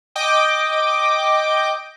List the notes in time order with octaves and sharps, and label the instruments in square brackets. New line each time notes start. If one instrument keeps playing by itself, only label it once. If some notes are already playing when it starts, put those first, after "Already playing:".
[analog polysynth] D#5 G5 D6